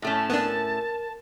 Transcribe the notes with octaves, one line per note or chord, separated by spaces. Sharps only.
A2 A3 C#4 A5
B3 D4 A#4